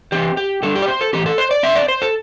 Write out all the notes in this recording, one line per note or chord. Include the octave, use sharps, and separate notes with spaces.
E3 C4 G4
G4
D3 G3 D4 A4
G4
D5
C5
A4
A2 E3 C4 G4
A4
C5
D5
D3 C4 E5
D5
C5
A4